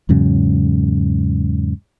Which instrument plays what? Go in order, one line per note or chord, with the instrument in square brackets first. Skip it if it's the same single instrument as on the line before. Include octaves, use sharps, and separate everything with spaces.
[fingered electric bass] E2 G#2 C#3 F#3